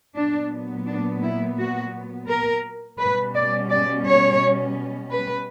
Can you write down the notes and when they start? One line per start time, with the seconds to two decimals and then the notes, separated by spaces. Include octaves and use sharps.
0.15 A#2 F#3 B3 D4
0.86 D4
1.22 E4
1.58 F#4
2.28 A#4
2.99 B2 G3 C#4 B4
3.34 D5
3.70 D5
4.05 C#5
5.11 B4